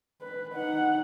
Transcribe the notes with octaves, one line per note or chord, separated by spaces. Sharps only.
B4
D#4 F#5